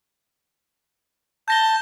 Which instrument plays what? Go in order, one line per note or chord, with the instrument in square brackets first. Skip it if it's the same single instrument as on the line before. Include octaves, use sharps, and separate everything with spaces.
[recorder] A5 [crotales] G6 A#6 G7